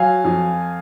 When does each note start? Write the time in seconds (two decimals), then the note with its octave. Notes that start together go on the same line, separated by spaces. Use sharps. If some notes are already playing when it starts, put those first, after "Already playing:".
Already playing: F#3 F5 G#5
0.24 F2